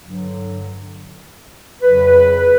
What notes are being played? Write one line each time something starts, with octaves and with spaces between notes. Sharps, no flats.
G2 D3 F#3
F2 C#3 F#3 B4